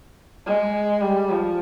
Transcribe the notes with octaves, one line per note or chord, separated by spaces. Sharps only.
G#3
G3
F3